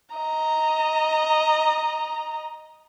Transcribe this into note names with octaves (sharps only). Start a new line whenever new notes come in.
D#5 A#5